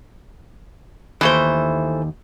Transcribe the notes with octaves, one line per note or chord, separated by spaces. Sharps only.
D#2 E3 A3 C5